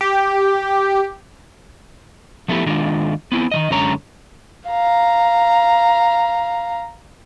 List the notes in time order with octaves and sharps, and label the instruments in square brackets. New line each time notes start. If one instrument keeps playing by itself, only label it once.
[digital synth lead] G4
[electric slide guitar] F3 A3 B3 E4 G4
D#3 G#3 D4 F4
B3 C4 E4
D#3 F3 D#5
F#2 D3 G#3 C#4 C#5 A#5
[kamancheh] F5 A#5